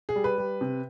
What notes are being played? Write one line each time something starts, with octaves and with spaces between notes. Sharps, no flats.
G#4
G3
B4
G3
C3